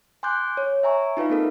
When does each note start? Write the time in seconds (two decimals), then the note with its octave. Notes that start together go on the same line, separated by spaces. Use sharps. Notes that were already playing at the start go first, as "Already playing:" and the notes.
0.23 G#5 C6 D6 F#6 G6
0.57 C#5
0.83 E5 G#5 A#5 C#6
1.17 D#4 F4 B4 F5
1.30 A#3 C4 A4 A#4